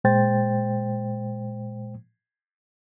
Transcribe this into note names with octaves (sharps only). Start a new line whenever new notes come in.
A#2 G#3 C5 G5 A6